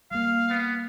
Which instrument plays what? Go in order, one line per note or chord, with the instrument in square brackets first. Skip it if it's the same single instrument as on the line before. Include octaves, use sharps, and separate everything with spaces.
[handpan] G3 A#3 [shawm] F5
[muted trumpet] B3